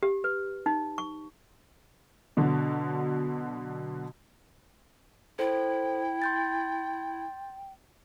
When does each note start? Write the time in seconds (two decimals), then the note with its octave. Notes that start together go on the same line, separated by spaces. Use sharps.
0.03 G4
0.24 B4
0.66 D#4
0.98 C#6
2.37 B2 D3 F#3
5.39 E4 A4 C5 G5
6.22 C6 G6 A6